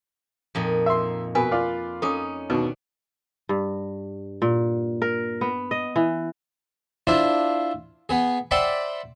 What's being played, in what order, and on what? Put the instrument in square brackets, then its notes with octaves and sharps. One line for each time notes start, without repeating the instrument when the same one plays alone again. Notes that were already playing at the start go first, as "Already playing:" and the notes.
[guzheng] F2 A#2 D#4
[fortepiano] E5 C6
[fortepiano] B2 [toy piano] A#4 G#5 B5 [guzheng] B4
[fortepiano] F4 D5 F5
[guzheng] C#4 D#4 [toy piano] A4 D6 D#6
[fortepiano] D#2 B2 [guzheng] D4
[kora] G2
A#2
A#4
B3
D#5
E3
[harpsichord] D4 E4 F4 C5
B3 G#4
C5 D5 E5 F#5 G5 B5